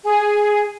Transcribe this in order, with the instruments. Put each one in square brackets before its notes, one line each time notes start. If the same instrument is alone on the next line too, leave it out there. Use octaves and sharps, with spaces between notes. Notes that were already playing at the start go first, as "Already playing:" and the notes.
[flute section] G#4